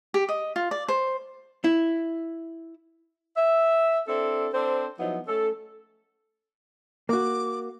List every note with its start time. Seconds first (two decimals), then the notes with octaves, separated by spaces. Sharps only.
0.14 G4
0.29 D#5
0.56 F4
0.71 D5
0.88 C5
1.64 E4
3.35 E5
4.07 C4 D4 E4 A4
4.52 C4 D4 A4 C5
4.98 F3 F#3 B3 D#4 E4
5.27 A3 C#4 A4
7.09 A#3 F#4 D6